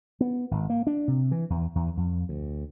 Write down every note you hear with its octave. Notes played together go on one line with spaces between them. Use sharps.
B3
G#1
A#3
D4
C3
E3
E2
E2
F2
D2